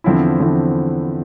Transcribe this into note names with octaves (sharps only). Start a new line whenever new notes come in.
E2 D3 F3 C4 E4
E2 D3 F3 C4 E4